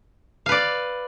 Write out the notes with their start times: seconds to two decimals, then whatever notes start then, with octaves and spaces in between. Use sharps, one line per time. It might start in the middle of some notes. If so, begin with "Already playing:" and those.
0.46 F5
0.49 B4
0.52 D5